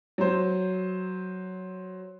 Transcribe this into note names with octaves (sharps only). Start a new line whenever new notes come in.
F#3 C5